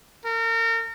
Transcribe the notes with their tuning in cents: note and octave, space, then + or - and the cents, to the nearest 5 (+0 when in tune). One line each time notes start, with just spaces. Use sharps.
A#4 -35